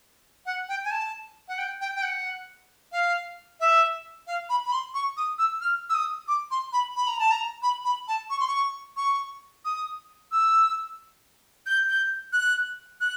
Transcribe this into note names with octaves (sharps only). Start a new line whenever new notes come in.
F#5
G5
G#5
A5
F#5
G5
G5
G5
F#5
F5
E5
F5
B5
B5
C6
C#6
D#6
E6
F6
E6
D#6
D6
C6
B5
B5
A#5
A5
A#5
B5
B5
A5
C#6
C6
C#6
C#6
D#6
E6
G6
G6
F#6
F#6